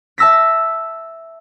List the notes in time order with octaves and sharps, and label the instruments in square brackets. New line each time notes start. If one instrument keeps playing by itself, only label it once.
[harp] E5 A5 E6 A#6 B6